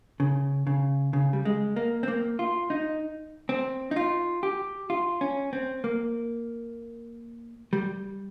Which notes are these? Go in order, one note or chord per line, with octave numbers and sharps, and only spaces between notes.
C#3
C#3
C#3
G3
G#3
A#3
C4
A#3
F4
D#4
C4
D#4
F4
G4
F4
C#4
C4
A#3
G3